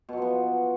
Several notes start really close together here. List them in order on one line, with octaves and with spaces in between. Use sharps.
B2 F#3 F3 B3